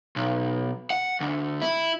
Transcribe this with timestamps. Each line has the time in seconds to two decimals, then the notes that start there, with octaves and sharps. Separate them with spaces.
0.16 B1
0.90 F#5
1.21 D2
1.61 E4